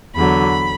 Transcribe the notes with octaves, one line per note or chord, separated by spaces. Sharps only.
E2 D3 F#3 B5